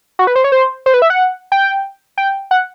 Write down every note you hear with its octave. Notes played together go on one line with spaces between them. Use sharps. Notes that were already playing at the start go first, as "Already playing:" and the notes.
F#4
B4
C5
C#5
C5
C5
B4
E5
F#5
G5
G5
F#5